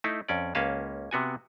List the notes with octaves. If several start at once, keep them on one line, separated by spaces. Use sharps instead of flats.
A3 D#4 E4
F2 C#4 D5
C#2 A#3 C#4 B4 F5 A5
C3 B3 F#4 G#5